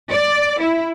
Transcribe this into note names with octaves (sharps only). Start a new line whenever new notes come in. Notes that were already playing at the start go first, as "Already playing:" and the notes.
D5
E4